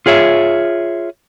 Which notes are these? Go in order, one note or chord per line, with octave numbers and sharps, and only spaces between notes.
F4 G#4 C#5 E5